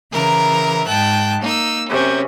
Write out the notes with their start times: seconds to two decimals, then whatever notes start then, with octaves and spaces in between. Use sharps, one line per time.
0.11 C#3 E3 A#4 A#5
0.85 G#2 G5 A5 F#6
1.41 A#3 D#4 E6
1.88 F#2 C3 C#4